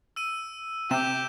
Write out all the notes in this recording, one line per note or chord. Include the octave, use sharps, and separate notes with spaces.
E6 D#7
C3 G4 E7